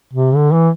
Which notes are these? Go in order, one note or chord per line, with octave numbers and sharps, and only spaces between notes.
C3
D3
E3